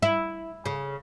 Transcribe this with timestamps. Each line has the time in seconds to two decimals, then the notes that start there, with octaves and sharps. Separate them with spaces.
0.02 E4
0.66 C#3